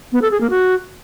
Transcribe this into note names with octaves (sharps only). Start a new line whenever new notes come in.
B3
A4
G#4
A#3
F#4